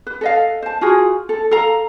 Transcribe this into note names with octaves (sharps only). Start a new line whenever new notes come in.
B4
A4 D#5 F5
C5 A5
F4 F#4 G#4
A4
A4 F5 A#5